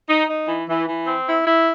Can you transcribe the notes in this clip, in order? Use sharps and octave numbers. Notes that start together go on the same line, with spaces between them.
D#4
D#4
E3
E3
E3
C4
E4
E4